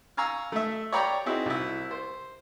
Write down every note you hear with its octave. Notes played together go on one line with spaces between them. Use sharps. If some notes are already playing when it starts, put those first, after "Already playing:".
F5 G#5 A#5 C#6 E6
A3 E5
C#5 D5 G5 A#5 B5 C#6
C4 D#4 E4 F#4 G#4
C2 E4
C5